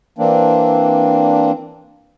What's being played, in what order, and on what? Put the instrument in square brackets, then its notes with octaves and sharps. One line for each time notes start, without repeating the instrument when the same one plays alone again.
[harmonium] E3 A#3 C4 D4